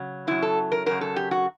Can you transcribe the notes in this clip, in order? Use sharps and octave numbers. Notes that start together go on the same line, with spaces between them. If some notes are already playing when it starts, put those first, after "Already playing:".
Already playing: C#3 F#3
F#2 C#3 F#3 E4
A4
A#4
F#2 C#3 F#3 A#4
A4
G4
F#4